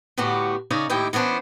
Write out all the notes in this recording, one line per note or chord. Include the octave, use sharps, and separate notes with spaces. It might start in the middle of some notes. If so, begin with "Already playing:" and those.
A2 D3 B3 F#4 G4
C#3 D#4 C#5 D5
D#2 A2 D#4 E4 G4 G5
E3 B3 C#4 D4 C5